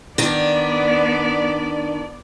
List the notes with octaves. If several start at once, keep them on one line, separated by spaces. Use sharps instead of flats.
D#3 B3 D4 D5